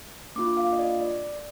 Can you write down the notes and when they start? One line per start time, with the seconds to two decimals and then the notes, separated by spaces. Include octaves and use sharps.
0.36 A#3 D4 F4 D6
0.57 F5
0.73 D#5
0.79 D5
1.01 D5